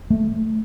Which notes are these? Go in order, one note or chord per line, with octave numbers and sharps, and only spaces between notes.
A3